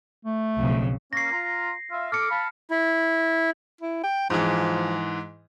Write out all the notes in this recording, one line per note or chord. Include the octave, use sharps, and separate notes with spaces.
A3
B1 F2 C#3
A#3 C#4 A#6 C7
F4 A#5
F4 E5 F5
A4 D6 F6 C#7
F5 A5 B5
E4
E4
G5
G#2 E3 F3